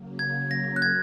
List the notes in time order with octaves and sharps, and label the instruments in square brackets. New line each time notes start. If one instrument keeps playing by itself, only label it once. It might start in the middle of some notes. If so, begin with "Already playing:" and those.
Already playing: [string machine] C#3 F#3 A#3
[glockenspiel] G#6
A#6
F#6
G#6